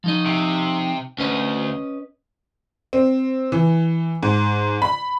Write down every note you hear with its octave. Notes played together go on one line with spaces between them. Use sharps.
F3 D#4 D#5
C3
D2 C#4 B4 D#5
C4
E3
G#2
B5